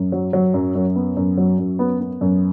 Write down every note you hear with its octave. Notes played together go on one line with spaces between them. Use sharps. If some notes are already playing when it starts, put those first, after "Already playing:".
Already playing: F#2
F#3
F#3
F#2
F#2
B3
F#2
F#3
F#2
B3
B3
F#2